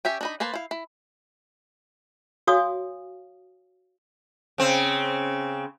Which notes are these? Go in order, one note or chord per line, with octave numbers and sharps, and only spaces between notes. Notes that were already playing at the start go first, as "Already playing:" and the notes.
C#4 G4 E5 G5
D4 D#4 B5
A#3 B4 C5 A5
E4 F5
E4
F#4 C#5 F5 G#5 D#6
C#3 C4